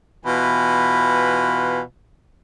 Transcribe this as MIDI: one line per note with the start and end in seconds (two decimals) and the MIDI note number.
0.26 1.80 47
0.26 1.80 52
0.26 1.80 65
0.26 1.80 71
0.26 1.80 80
0.26 1.80 83